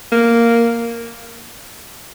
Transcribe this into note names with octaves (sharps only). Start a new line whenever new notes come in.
A#3